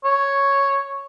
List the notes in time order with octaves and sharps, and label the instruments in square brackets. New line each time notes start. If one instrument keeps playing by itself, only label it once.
[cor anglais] C#5